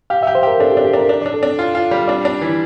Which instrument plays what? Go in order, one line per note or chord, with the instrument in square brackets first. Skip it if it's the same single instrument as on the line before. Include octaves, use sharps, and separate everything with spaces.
[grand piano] G4 [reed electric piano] F5
[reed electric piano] E5
[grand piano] G4
[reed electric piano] C5
[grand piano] G4 [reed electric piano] A#4
[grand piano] D4 [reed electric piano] A4
[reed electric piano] G4
[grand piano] D4
[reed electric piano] G4
[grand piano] D4 [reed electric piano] A#4
[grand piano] D4
[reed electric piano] D5
[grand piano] D4
[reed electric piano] A4
[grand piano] D4
F4
F4
G3
[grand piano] D4 [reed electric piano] D5
[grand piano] D4
E3